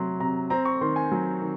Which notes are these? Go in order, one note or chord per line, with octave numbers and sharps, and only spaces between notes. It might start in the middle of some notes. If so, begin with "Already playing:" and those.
Already playing: C3 F#3 C4 C6
C3 A#5
C4 A#5
C#6
D#3 C6
G#5
F#3
D#3